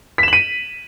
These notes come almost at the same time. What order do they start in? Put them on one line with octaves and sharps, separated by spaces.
B6 E7 F#7 D#7